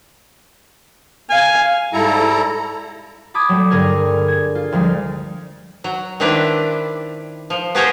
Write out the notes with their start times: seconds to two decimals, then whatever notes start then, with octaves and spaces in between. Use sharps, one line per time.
1.30 F5 G#5
1.93 G#2 G3 E4 A4 A#5
3.34 A5 B5 D6 D#6 G#6
3.49 F#3 G3 A3
3.70 G2 D3 G#4 A#4 G#6
4.28 G#6
4.55 F4
4.72 D2 F3 G3 G#3
5.84 F#3
6.20 D#3 C4 D4 E4 B4 D5
7.50 F3
7.75 B3 G4 G#4 A#4 C5 C#5